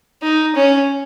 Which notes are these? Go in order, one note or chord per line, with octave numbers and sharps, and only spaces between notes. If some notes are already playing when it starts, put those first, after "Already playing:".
D#4
C#4